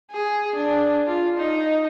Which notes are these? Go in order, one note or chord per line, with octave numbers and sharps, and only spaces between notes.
G#4
D4
F4
D#4